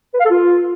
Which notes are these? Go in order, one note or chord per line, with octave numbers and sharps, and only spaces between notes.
B4
F5
A4
F4